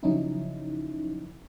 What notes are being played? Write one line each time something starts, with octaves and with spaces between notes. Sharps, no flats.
C#3 F3 F#3 C#4 D#4 E4